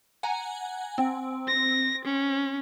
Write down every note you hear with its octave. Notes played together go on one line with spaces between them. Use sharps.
F#5 G#5 A#5
C4
A#6
C#4